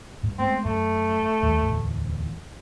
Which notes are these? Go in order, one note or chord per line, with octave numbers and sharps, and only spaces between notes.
G2
G#3 A3 B3 C4
F#2 A3
D#2 G3
D1 E2